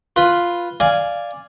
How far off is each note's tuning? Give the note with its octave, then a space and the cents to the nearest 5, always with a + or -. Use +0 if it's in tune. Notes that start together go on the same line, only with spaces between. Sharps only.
F4 +0 B4 +0
D5 +0 F5 -5 G#5 +0